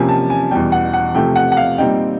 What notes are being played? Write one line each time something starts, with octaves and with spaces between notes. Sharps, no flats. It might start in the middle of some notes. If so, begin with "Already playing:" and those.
Already playing: C3 F3 A#3 C#4 G#5
A5
G#5
E2 B2 G3 G5
F#5
F#5
C3 F3 A3 G5
F#5
F#5
F5
A#2 G3 C4 D#4 G5